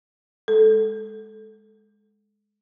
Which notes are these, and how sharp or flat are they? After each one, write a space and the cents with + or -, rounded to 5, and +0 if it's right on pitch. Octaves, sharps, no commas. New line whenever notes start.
G#3 +0 A4 -5